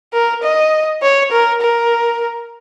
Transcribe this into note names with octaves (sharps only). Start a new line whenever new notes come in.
A#4
D#5
C#5
A#4
A#4